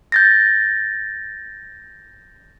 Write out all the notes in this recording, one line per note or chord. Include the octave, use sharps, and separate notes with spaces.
G6 A6 A#6